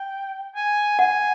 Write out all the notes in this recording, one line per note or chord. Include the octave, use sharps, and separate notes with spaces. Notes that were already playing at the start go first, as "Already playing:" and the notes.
Already playing: G5
G#5
F#5 G#5